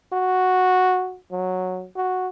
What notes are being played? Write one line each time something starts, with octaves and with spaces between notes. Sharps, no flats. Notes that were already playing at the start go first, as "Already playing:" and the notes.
F#4
F#3
F#4